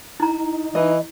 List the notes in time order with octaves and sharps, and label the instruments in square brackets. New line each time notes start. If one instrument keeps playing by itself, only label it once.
[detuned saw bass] D#4 [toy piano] E4 A#5
[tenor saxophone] E3 [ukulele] D#5